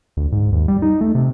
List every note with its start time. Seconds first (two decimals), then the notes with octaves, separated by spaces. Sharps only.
0.17 D2
0.32 G#2
0.52 D#2
0.68 G3
0.82 D#4
1.01 A3
1.15 C3